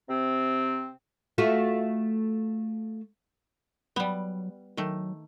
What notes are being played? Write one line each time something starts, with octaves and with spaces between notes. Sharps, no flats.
C3 C4
A3 F4 F#4
F#3 G3 B3
D#3 F#3 A3